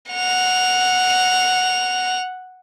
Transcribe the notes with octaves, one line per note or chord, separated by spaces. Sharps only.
F#5 F7